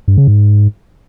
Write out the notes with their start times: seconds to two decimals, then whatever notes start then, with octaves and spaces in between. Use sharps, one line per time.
0.08 G2
0.18 C#3
0.27 G#2